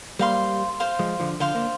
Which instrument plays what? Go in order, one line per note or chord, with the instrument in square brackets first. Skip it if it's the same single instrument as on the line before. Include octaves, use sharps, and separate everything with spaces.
[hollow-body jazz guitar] G3 A#3 [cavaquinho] C5 F5 C6
[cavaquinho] C5 F5 C6
[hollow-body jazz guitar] F3 G#3
D3 F3
[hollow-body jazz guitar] D3 F3 [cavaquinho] C5 F5 C6
[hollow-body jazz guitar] A#3 D4